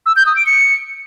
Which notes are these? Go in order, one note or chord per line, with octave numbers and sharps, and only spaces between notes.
E6
G6
D#6
D7
C#7